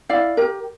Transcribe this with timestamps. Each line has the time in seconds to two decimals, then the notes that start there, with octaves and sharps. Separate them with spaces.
0.09 E4 D5 F5
0.37 G4 A#4